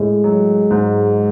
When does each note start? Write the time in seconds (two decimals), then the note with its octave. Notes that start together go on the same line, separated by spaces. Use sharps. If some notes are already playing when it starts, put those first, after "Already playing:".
Already playing: A2 G#3
0.24 F#3
0.71 G#2